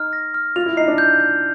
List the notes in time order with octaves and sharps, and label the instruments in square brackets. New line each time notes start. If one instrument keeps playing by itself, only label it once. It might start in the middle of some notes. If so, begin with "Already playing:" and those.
Already playing: [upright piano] D#4 [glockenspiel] F6
[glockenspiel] A#6
F6
[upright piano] F4 [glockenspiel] F7
[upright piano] E4
[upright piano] D#4 [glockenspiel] C7
[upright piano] D4
[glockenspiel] G6
G6